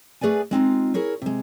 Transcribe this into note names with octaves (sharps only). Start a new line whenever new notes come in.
A3 G#4 B4 D5 G#5
G#3 C4 D#4 F4
E4 G#4 A#4 C#5
C3 G#3